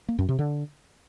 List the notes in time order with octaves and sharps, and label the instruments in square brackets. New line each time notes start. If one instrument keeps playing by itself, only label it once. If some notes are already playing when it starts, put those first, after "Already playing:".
[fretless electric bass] A#3
F#2
C3
D3